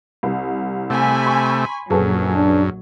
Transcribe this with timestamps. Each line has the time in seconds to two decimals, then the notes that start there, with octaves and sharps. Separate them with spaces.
0.23 C2
0.90 C3 A3 G#5 B5
1.26 C6 C#6
1.90 A#1 F#2 F#3 G#4 A4 B4
2.35 D4